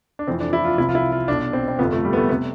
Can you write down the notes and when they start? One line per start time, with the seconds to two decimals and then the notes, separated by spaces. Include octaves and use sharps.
0.19 D4
0.27 F1 F2 E3 C4
0.41 D4
0.53 E4
0.65 F4
0.78 C2 C3 F3 E4
0.89 F4
0.95 E4
1.12 F4
1.28 B1 B2 D4
1.53 C4
1.68 C4
1.78 G1 F2 C3 F3 B3
1.92 A3
2.05 G3
2.13 B3
2.17 A3
2.29 C3 B3